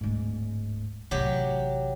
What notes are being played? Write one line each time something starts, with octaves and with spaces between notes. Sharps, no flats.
D1 G#2
A1 C3 F#3 G4